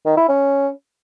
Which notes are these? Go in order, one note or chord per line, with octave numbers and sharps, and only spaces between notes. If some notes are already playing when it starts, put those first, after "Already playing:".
D#3
E4
C#4